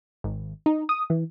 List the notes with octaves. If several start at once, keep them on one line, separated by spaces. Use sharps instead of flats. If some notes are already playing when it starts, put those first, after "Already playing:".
G#1
D#4
D#6
E3